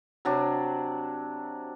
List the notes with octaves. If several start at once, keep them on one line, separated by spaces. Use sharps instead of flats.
C3 F#3 D4